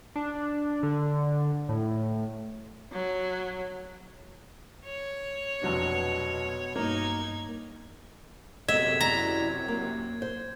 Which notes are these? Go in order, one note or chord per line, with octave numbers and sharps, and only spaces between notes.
D4
D3
A2
F#3
C#5
F1 B2 F#3 D4
G2 A#3 D#4 G#6
F#2 C3 F#3 B3 A4 D#5 E5 G#6
E4 D5 D#5 A#5
A#3
C5